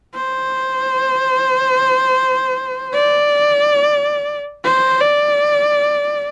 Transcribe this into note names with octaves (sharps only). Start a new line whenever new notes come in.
C5
D5
C5
D5